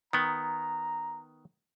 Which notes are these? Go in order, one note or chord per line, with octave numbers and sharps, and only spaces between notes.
D#3 B3 A#5